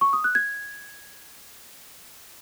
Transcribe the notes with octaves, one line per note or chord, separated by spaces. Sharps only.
C#6
D#6
F#6
G#6